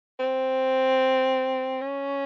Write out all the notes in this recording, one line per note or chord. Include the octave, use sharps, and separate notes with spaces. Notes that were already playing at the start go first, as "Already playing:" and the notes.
C4
C#4